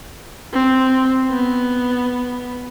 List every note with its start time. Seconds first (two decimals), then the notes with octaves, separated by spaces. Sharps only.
0.54 C4
1.31 B3